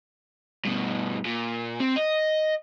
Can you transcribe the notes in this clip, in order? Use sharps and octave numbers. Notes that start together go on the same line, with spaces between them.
G2 B2
A#2
C4
D#5